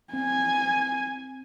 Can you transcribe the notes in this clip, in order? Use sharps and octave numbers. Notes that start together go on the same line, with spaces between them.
C4 G#5